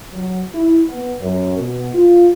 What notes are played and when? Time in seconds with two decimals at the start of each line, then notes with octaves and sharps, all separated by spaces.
0.12 F#3
0.54 E4
0.87 B3
1.19 F#2
1.58 B2
1.94 F4